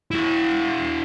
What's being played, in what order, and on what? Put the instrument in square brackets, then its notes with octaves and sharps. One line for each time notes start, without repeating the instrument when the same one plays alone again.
[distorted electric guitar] E4 F#4